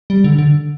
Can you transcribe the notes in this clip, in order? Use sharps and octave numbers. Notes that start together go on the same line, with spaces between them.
G3
D3
D3